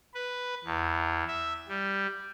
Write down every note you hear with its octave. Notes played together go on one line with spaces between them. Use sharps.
B4
E2
E5
G3